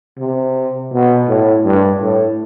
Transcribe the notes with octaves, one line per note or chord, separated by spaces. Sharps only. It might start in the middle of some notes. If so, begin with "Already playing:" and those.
C3
B2
A2
G2
A2